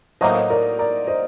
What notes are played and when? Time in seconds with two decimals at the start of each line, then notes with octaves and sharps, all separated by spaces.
0.21 A2 F#3 A#3 D#4 C5 D#5
0.50 A#4 D5
0.79 A#4 D5
1.07 C5 D#5